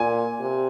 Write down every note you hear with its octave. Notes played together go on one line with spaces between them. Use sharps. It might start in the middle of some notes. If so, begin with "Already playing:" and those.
Already playing: A#2 G#5
C3